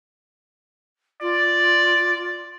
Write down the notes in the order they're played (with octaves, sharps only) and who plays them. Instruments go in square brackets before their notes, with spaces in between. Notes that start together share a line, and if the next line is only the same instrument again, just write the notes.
[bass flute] F4 [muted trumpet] D5